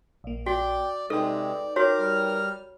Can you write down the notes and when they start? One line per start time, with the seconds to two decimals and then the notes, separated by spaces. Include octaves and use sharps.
0.24 A#1 A#3
0.46 F#4 D5 G5
1.10 C3 G#3 D#4 A4 B4 D5 G5
1.76 F#4 A#4 C#5 D6
1.99 G3 F6